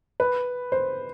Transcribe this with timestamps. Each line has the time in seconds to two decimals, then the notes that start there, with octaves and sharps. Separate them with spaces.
0.20 B4
0.72 C5